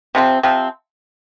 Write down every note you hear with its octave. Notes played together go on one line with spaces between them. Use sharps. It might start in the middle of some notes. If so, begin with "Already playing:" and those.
C3 F3 C4
C3 F3 C4